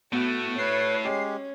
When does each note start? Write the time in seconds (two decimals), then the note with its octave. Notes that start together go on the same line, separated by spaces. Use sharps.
0.13 A2 A3 B3 F#4
0.58 B4 C#5 C7
1.05 G#3 C#4 G4